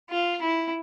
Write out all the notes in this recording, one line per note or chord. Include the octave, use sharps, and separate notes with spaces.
F4
E4